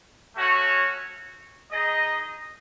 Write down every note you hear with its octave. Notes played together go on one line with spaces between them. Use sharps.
A3 C#4 F#4 C#5
D#4 G#4 D#5